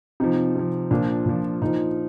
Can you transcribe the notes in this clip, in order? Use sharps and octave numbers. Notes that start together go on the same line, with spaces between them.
C3 F3 D#4
C3 F3
A#2 F3 D4
A#2 F3
A#2 F3 D#4